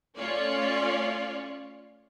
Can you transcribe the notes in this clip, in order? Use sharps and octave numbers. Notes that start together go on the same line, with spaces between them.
A3 C#4 F4 C#5 D5